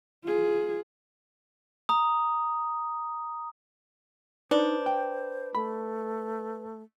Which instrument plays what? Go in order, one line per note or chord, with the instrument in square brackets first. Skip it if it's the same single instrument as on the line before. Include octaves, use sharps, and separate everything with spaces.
[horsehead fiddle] F4 G#4
[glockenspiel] A#5 D#6
[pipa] D4 [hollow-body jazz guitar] D#4 [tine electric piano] B4 [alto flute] C5
[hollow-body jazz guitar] G5
[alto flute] A3 [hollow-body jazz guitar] B5